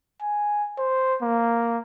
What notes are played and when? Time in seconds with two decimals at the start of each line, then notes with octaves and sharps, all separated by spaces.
0.22 G#5
0.78 C5
1.22 A#3